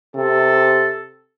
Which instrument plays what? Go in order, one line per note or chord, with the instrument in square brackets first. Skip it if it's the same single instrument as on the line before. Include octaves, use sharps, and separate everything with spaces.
[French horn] C3 [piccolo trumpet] A4